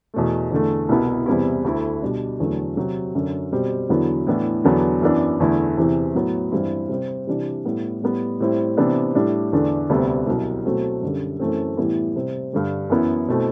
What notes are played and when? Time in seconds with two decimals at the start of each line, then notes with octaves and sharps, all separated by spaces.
0.14 E2 B2 A3
0.51 E2 D3 A3
0.89 C2 B2 G3 B3 E4
1.26 E2 C3 G3 B3 E4
1.64 D2 D3 A3 E4
2.02 B2 G3 D4
2.40 E2 D3 F#3 A3
2.77 C3 F#3 C4
3.15 F#2 D3 F#3
3.52 B2 G3 C4
3.89 E2 D3 F#3 B3 E4
4.27 A2 E3 B3 D4
4.64 E2 D3 F#3 B3 D4
5.02 F#2 E3 B3 D4
5.40 E2 D3 A3 E4
5.78 E2 C3 E3
6.15 A2 F#3 B3
6.52 G2 E3 G3 C4 E4
6.89 C3 G3 C4
7.27 C3 E3 G3 D4
7.65 A2 G3 B3
8.02 A2 G3 B3
8.40 A2 G3 C4 E4
8.77 C3 E3 B3 D4
9.15 A2 G3 D4
9.53 E2 D3 A3 D4
9.89 D2 C3 G3 B3 D4
10.27 C2 B2 F#3
10.66 B2 F#3 A3 C4
11.02 F#2 D3 G3
11.40 F#2 E3 A3 C4
11.77 A2 E3 G3 B3 E4
12.15 C3 G3 C4
12.53 G2 D3 G3
12.90 F#2 E3 B3 E4
13.28 B2 A3 C4 E4